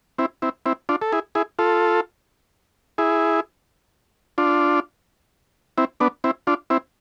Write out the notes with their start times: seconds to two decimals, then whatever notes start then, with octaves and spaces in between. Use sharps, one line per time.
0.18 C4 E4
0.42 C4 E4
0.66 C4 E4
0.89 D4 F4
1.02 A4
1.12 E4 G#4
1.35 E4 G#4
1.59 F4 A4
2.98 E4 G#4
4.38 D4 F4
5.78 C4 E4
6.00 B3 D4
6.24 C4 E4
6.47 D4 F4
6.70 C4 E4